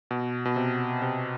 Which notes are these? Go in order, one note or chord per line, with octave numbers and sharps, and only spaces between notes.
B2
B2
C3
C3